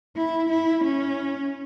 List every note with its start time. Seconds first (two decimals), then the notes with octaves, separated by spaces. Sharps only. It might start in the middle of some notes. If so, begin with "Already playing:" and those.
0.17 E4
0.50 E4
0.84 C#4